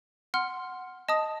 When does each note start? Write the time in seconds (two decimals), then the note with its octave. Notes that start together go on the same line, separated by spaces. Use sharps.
0.34 F#5 C6 F6
1.09 D#5 A5 D#6